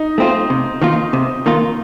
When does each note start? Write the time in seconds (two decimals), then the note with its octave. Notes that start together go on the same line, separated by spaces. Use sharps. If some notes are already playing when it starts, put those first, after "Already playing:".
Already playing: D#4
0.18 A3 C4 F4
0.50 C3
0.82 D#3 A#3 F4
1.13 C3
1.46 D#3 A#3 F4